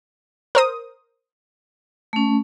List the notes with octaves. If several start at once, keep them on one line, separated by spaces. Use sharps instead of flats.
A#4 C5 D#6
A3 C#4